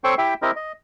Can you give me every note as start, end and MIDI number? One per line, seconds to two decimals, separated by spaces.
0.04 0.14 60
0.04 0.14 69
0.04 0.14 72
0.04 0.14 73
0.04 0.14 79
0.04 0.14 85
0.18 0.34 64
0.18 0.34 67
0.18 0.34 76
0.18 0.34 79
0.42 0.51 60
0.42 0.51 64
0.42 0.51 67
0.42 0.51 70
0.42 0.51 75
0.56 0.72 75